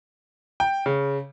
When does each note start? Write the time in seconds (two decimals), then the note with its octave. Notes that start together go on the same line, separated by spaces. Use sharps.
0.60 G5
0.86 C#3